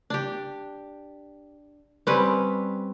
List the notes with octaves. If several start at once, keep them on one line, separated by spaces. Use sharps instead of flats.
D4 G4
G3 C4 C#4 B4